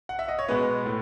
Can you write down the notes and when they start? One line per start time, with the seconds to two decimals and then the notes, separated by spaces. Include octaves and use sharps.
0.09 F#5
0.19 E5
0.28 D#5
0.39 C#5
0.48 B2 G#3 B3 B4
0.86 A2